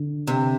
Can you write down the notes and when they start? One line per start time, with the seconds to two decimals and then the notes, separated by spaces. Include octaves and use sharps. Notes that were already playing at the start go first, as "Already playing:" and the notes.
Already playing: D3
0.27 C3